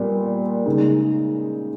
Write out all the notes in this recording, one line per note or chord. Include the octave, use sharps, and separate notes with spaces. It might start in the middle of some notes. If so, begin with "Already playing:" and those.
Already playing: A#2 G3 B3
C#3 G#3 D#4